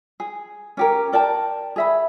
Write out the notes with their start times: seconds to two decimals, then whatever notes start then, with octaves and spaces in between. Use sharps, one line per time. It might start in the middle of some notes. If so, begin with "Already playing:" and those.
0.20 G#4
0.77 C#4 G4 A#4
1.12 A#4 D5 G5 A5
1.76 G#4 E5 B5